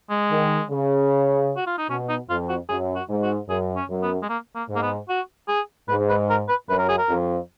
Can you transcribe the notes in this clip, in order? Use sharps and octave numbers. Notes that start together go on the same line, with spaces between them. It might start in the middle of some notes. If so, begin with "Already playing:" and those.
G#3
D#3
C#3
F#4
F4
D#4
B2 C#4
D#4
F2 F4
F#4
F#2 G#4
F#4
G#2
F#4
F#2 G#4
C#4
F#2
B3
G#3
A#3
A#3
G#2
A#3
B3
F#4
G#4
G#2 B4
B4
A#4
B4
F#2 B4
A#4
G#4
A#4
F2